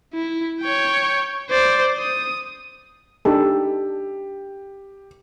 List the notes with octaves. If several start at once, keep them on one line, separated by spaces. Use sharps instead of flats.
E4
C#5 G5
C5 D5
D#6
D4 D#4 G4 A4